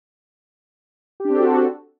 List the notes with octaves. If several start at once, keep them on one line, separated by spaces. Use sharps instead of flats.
C4 D4 F#4 G4 A4